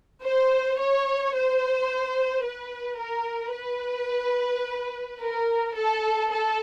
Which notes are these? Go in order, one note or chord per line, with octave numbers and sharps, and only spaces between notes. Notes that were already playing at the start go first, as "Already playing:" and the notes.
C5
C#5
C5
B4
A#4
B4
A#4
A4
A4